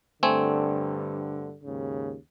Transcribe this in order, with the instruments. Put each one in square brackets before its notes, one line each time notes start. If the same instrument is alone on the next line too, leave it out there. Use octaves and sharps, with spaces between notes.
[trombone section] G2 D3 [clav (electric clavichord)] A3 C4 G#5
[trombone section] D#2 G#2 C#3